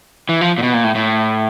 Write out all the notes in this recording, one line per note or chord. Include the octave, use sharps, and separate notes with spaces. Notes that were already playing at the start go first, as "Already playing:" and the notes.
E3
F3
A#2
B2
A#2
A2
A2